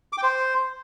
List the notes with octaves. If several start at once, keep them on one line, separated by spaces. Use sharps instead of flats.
D6
G5
C5